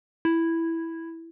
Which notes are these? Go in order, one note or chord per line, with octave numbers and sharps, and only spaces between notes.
E4